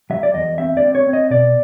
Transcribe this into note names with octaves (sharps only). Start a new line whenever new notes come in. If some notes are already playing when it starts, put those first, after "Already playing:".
F#3 E5
D5
E2 D#5
C4 E5
D5
C4
C#5
C4
D#5
B2 D5